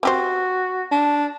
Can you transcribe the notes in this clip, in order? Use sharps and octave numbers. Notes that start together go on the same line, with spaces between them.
C4 F#4 G4 C5
D4